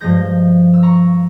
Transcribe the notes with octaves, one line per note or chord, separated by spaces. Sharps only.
G2 F3 G#3 G6 A#6
E6
A#5 C#6